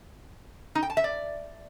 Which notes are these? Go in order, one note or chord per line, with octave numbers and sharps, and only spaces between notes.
D#4
G5
A5
E5
D5